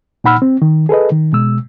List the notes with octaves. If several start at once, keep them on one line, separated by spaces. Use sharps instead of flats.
A#2 D#4 F#5 B5 E6 F6
C4
D#3
G#4 A4 B4 D#5
D#3
B2 G#3 E6